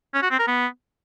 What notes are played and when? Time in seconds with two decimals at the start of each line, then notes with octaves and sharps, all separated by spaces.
0.14 C#4
0.23 F#4
0.31 C4
0.39 A#4
0.47 B3